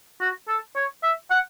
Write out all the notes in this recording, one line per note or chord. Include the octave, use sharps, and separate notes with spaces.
F#4
A4
C#5
E5
F#5